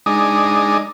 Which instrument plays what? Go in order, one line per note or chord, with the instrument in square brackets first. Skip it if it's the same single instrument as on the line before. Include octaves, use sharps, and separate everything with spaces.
[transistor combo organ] G#3 D4 D#4